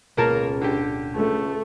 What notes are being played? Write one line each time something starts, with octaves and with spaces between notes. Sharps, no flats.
D1 C#2 B2 A#3 C#4 A#4 A5
D3 G4
C#2 A3